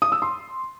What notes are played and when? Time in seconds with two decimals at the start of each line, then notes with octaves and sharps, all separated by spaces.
0.02 D#6
0.12 E6
0.22 C6